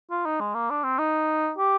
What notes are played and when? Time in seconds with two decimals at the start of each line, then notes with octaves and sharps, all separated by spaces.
0.11 F4
0.26 D#4
0.40 G#3
0.55 A#3
0.70 D4
0.84 C4
0.99 D#4
1.58 G4